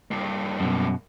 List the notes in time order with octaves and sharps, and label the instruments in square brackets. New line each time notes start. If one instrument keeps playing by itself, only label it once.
[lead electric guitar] G2 A#3
[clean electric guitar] F#2 B2